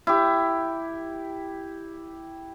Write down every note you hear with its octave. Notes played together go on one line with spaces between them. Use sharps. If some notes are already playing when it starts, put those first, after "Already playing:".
E4 G4